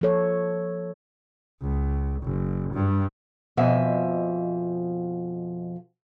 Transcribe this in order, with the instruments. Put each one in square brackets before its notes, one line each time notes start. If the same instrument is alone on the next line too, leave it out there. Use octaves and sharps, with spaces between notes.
[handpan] F3 A#3 A4 C#5
[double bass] C#2
F#1
G2
[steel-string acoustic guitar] F2 B2 F3 E5 G#5